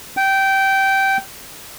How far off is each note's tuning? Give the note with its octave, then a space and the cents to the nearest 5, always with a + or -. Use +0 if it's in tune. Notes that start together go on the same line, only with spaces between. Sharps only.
G5 -15